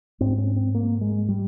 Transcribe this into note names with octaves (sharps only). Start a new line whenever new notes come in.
G#2 C4
C#4
C4
A#3
G#3
G3